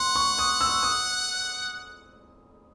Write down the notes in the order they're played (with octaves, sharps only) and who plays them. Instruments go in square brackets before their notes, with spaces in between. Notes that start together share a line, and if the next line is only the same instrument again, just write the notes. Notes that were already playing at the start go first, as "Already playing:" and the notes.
Already playing: [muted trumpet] F#5 [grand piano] C6
[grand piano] C#6
D#6
E6
D#6